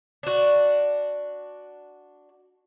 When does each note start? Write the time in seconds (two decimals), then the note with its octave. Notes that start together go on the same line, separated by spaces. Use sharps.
0.23 D4 F#4